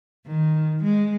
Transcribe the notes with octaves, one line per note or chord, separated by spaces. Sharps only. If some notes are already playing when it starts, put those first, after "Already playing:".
D#3
G#3